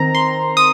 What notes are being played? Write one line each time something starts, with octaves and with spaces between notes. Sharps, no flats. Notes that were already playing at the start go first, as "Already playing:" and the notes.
Already playing: D#3 C4 A#5
C6
D#6